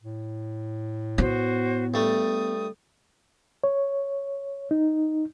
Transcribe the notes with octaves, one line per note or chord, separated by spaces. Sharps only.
A2
B3 F#4 C5
G2 A3 D#6
C#5
D#4